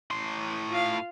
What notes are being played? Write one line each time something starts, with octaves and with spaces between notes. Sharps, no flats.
A2 C6
F4 F5